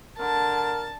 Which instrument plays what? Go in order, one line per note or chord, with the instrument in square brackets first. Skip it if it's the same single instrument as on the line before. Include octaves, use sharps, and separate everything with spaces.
[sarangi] D3 [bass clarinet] A#4 [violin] A5